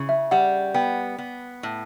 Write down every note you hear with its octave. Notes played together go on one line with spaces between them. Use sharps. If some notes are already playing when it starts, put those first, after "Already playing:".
Already playing: C#3 E4
E5
G3 F#5
B3 G5
B3
A2